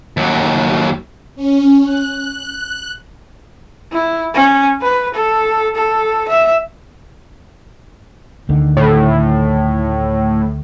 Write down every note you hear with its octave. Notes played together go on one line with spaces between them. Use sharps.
D#2 F#3
C#4
F#6
E4
C#4
B4
A4
A4
E5
D2 D3 D#3
A2